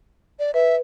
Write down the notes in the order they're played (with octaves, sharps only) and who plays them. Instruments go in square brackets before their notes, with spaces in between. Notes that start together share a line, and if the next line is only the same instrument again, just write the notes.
[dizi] D5
[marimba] B4 [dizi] E5